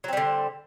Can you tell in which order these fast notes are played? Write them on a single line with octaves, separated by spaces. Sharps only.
F#3 C4 G3 D3